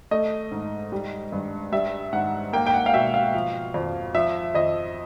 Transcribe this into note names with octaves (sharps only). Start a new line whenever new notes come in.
A3 D#5
G#2
G3
G2
G3 E5
G#2 F#5
A#3 G5
G5
F#5
F5
B2 E5
F5
F3
F2
F3 E5
F2 D#5